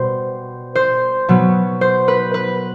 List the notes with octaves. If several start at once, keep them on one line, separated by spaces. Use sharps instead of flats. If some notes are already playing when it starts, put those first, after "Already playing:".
Already playing: B2 G3 B3 C5
C5
B2 F#3 B3
C5
B4
B4